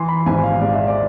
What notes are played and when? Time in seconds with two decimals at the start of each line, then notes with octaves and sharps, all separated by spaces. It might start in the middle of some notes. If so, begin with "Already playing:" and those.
Already playing: E3 C6
0.08 B5
0.26 G#1 G#5
0.43 F5
0.61 G#2 D5
0.74 E5
0.87 D5